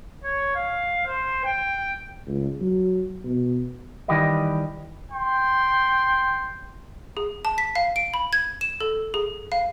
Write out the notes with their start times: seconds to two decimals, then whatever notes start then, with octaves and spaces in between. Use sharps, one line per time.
0.24 C#5
0.55 F5
1.06 C5
1.44 G5
2.27 C#2
2.61 F#3
3.24 B2
4.08 D#3 E3 G3 G4 B4 D#5
5.12 G5 C6
7.17 G#4
7.45 A5
7.58 B6
7.76 F5
7.96 D7
8.14 B5
8.33 G#6
8.61 E7
8.81 A4
9.14 G#4
9.52 F5